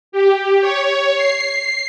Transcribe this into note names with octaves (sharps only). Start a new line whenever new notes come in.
G4
C#5
C7